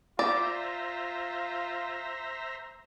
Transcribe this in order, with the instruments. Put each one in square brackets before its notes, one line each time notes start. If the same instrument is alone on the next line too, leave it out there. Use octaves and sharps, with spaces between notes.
[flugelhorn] F4 [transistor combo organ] C5 E5 A#5 [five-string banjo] D5